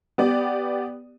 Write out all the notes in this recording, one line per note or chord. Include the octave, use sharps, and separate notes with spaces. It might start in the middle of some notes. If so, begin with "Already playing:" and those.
B3 G4 D5